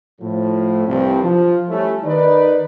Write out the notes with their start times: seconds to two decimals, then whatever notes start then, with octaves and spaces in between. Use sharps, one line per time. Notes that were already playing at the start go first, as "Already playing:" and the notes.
0.21 A2 F3
0.87 C2 G2 C4
1.23 F3
1.69 G3 A3 C#4 E4
2.04 D#3 D#4 B4 D5